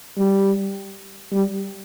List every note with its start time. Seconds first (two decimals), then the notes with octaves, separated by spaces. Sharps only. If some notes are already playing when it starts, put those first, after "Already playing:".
0.17 G3
1.32 G3